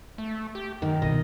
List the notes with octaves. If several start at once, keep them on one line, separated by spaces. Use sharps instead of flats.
A3
G4
F#2 D#3
C2 B2 D#5